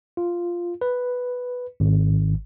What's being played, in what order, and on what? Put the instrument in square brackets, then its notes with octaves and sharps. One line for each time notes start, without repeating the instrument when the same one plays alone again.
[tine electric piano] F4
B4
G#1